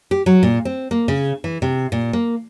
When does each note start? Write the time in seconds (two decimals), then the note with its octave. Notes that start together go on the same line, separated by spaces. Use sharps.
0.11 G4
0.26 F#3
0.43 A#2
0.65 C4
0.91 A#3
1.08 C#3
1.44 E3
1.62 C3
1.92 A#2
2.13 A#3